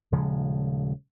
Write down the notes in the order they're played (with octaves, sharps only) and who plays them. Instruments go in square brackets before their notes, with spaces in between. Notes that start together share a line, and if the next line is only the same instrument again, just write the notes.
[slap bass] D#1 C#3 F3 G#3